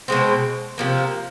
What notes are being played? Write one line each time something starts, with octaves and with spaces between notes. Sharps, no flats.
B2 G#3 C4
C3 F3 A#3